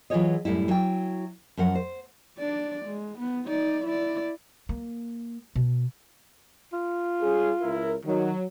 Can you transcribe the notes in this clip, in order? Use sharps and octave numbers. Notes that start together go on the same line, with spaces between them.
E3 F#3 F4 G#4 C#5 D#5
F#2 A2 G3 E4
F#3 E4 G5
F#2 F3 A#4 F#5
C5
D4 D5
G#3
B3
D#4 D5
E4 D5
A#3
B2
F4
G3 C#4 G#4
C#2 E4 A#4
D#3 F#3